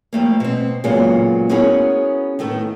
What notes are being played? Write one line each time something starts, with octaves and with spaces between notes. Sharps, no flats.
F3 G3 A3 A#3
B2 C4
A#2 C#3 F#3 G#3 A#3 B3
B3 C#4 E4 F#4 G#4 A#4
A2 D#3 A3 B3